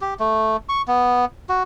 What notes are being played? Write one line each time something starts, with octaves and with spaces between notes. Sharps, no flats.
G4
A3
C#6
B3
F#4